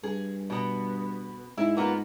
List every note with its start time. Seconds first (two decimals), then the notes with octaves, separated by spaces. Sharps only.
0.03 G2 G#4
0.50 B2 B3
1.58 G#2 E4
1.77 A#3 B3 F4